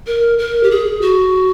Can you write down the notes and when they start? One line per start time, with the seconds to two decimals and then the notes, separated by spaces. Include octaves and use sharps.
0.07 A#4
0.39 A#4
0.63 G4
0.71 G#4
1.02 F#4